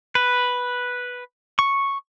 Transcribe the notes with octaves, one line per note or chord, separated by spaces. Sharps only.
B4
C#6